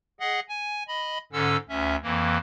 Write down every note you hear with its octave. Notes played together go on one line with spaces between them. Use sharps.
G#4 D#5 F#5
G#5
D#5 B5
G#2 D3 C#4 A4 E6
D2 C#4 E5
F2 E3 A#3